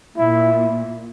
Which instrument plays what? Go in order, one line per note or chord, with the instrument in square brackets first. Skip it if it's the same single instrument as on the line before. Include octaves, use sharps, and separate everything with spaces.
[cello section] A#2 [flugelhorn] E4